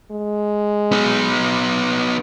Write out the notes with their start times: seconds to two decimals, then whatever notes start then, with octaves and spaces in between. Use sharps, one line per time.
0.11 G#3
0.92 B3 D#4